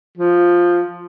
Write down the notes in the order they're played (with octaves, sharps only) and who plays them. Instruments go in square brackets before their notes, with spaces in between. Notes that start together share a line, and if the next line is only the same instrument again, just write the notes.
[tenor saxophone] F3